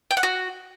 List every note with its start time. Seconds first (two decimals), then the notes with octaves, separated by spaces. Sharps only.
0.11 G5
0.17 F#5
0.23 F#4